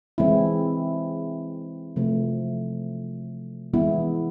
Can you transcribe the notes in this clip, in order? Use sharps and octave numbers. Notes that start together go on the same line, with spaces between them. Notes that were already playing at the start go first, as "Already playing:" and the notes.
E3 G#3 C4 E4
C3 F3 A3
E3 G#3 B3 E4